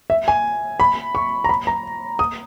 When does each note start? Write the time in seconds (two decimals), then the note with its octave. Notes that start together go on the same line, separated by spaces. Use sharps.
0.10 E5
0.28 G#5
0.80 B5
1.15 C#6
1.44 A#5
1.49 B5
1.67 A#5
2.19 D#6